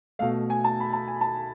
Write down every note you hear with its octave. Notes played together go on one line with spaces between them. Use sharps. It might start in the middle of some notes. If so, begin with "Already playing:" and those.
B2 A3 F5
G#5
A5
B5
A5
G#5
A5